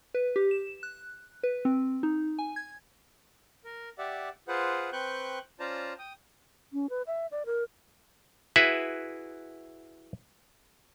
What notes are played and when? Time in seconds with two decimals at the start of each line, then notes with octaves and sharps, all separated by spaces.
0.14 B4
0.36 G4
0.51 E7
0.83 F#6
1.43 B4
1.65 C4
2.03 D#4
2.39 G#5
2.56 G#6
3.64 A#4
3.98 G4 D5 E5 F#5
4.48 F4 G#4 B4 C5 F#5
4.92 C4 B4 G5 C#6 F#6 G6
5.60 C#4 F4 C5 D5 A5 A#5
5.99 G5 D#6
6.73 C#4
6.90 B4
7.07 E5
7.31 D5
7.46 A#4
8.56 E4 F#4 G#4 B4 E5